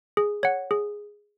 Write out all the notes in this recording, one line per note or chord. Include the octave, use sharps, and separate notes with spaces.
G#4
C#5 F#5
G#4